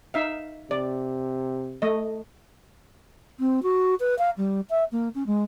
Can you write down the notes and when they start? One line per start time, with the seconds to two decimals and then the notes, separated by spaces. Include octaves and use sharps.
0.14 D#4 E5 F5
0.71 C3 D5
1.82 A3 D#5
3.40 C4
3.63 F#4
4.00 B4
4.18 F5
4.37 G3
4.70 E5
4.92 A#3
5.15 C#4
5.27 G#3